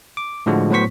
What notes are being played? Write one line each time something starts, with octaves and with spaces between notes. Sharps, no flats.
D6
A2 D3 F3 G#3 F#4
A2 F#3 B3 C5 C#6 B6